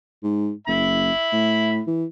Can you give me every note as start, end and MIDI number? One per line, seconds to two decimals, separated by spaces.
0.23 0.52 44
0.68 1.11 30
0.68 1.81 76
0.68 1.81 83
1.32 1.81 45
1.87 2.05 52